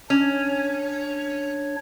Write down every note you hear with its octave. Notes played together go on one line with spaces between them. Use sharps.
C#4 D4 C#5